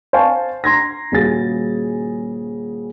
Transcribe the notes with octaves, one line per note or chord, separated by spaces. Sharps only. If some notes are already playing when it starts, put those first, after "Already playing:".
C5 F5 G#5 A5 C#6
A#5 C6 G#6 A#6
D#1 C#3 G3 F#4 G#4 A6